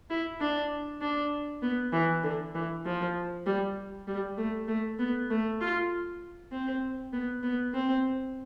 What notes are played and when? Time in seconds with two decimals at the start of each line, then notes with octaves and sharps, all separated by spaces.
0.10 E4
0.40 D4
1.01 D4
1.62 B3
1.93 E3
2.23 D3
2.55 E3
2.85 F3
3.46 G3
4.08 G3
4.37 A3
4.68 A3
4.99 B3
5.30 A3
5.61 F4
6.52 C4
7.13 B3
7.43 B3
7.74 C4